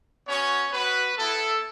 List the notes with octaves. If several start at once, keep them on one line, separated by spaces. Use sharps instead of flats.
B3 C#4 F#4 C#5
B3 F#4 B4
B3 E4 A4